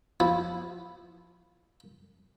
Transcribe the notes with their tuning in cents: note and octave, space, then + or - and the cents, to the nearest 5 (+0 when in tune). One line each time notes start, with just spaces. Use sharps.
F3 +0 E4 -5